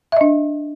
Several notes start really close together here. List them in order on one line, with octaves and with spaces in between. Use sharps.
E5 D#5 D4